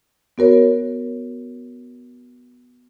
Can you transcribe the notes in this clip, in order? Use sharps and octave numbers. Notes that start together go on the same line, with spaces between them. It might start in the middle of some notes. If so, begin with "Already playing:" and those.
B3 F#4 A#4 C#5